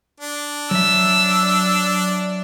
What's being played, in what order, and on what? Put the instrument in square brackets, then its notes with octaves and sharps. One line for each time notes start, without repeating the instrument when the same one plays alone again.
[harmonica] D4
[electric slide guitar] F#3 E5 [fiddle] E6